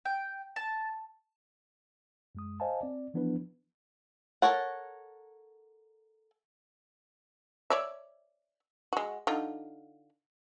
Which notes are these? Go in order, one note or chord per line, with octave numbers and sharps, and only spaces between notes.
G5
A5
F#2 G#3 D#6
C5 D#5 F5 G#5 A5
C4 D5
E3 F3 B3 D4 E4 B4
A4 A#4 C#5 F#5
C#5 D5 E5
G#3 F#4
D3 D#4 F4